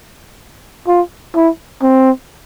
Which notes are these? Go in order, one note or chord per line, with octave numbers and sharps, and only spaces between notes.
F4
E4
C4